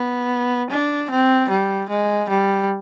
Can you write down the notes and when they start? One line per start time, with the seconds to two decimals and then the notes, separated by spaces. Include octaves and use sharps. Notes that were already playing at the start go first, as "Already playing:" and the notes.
Already playing: B3
0.71 D4
1.11 C4
1.50 G3
1.90 G#3
2.30 G3